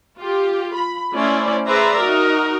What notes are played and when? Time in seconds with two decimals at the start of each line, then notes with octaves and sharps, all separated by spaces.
0.17 F4 G4
0.75 B5
1.12 A3 C#4 E4 C5 D5
1.66 G#4 B4 C5 D5 E5 A#5
1.99 D#4 F#4 A#4